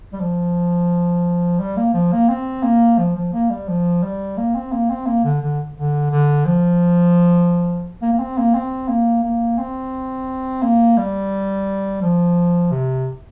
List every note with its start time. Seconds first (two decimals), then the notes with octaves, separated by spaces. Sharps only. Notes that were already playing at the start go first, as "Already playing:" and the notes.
0.13 G3
0.20 F3
1.60 G3
1.77 A#3
1.94 F3
2.12 A#3
2.29 C4
2.63 A#3
2.98 F3
3.16 F3
3.33 A#3
3.50 G3
3.68 F3
4.03 G3
4.37 A#3
4.55 C4
4.72 A#3
4.90 C4
5.06 A#3
5.24 D3
5.41 D3
5.76 D3
6.10 D3
6.45 F3
8.02 A#3
8.13 A#3
8.19 C4
8.37 A#3
8.54 C4
8.88 A#3
9.23 A#3
9.58 C4
10.62 A#3
10.97 G3
12.02 F3
12.71 C3